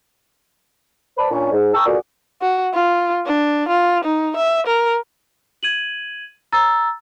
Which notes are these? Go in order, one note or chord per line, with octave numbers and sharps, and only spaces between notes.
B4 C5 D5 A5 B5
A#2 C#4 D4
G#2
G5 A5 A#5 C#6 D#6 E6
D2 A#2 F#4 G#4 D5
F#4
F4
D4
F4
D#4
E5
A#4
G#6 D#7 F#7
A#5 E6 A6